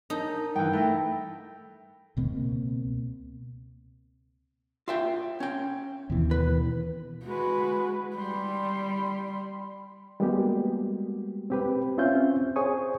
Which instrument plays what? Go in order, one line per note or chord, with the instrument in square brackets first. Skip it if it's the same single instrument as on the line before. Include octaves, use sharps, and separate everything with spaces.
[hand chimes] D4 A#4 A5 [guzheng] D#4
[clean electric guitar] G2 E3 [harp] G5
[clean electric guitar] A3 [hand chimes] B5 E6 A#6
[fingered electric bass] C#2 B2 A#3 C4
[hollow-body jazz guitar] F4 E5 G5
C#4 G5
[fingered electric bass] D#2 B2 E3
[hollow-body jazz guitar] B4
[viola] G#3 B4 [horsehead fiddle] F#4
[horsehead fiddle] G3 [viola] B5 C6
[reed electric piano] G3 G#3 A#3 B3 F#4 G4
C4 G4 B4
C4 C#4 F4 E5 G6
G#4 C5 C#5 G#5 C#6 D#6